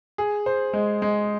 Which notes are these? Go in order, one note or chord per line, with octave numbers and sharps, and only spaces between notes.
G#4
C5
G#3
G#3